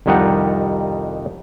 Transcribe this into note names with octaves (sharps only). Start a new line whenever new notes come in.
C2 F2 D#3 G3 D#4 F#5